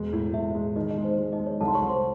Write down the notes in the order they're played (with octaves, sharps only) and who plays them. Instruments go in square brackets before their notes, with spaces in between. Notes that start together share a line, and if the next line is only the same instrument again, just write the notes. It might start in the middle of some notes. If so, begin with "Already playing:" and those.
Already playing: [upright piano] E1 G#3
A2
[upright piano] A2 [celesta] E4 E5
[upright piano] G#3
[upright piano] D#3 [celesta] D#4 D#5
[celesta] D#4 D#5
[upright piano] G#3
[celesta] C5
[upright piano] G#3
[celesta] D#4 D#5
[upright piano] G#3
[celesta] C#5
[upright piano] C2 [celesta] A4 A5
[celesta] C6
C#5 C#6
[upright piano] C2
[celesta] C5 C6